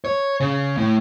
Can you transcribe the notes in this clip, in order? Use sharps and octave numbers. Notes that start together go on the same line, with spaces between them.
C#5
C#3
A2